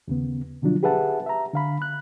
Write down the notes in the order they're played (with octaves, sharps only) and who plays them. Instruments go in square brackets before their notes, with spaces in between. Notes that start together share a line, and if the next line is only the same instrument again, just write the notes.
[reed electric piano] D#2 C#3 B3
B2 D3 F3 F#3 D4 F4
G4 G#4 B4 E5 F#5 A5
E5 A#5
D3 F5 B5
F#6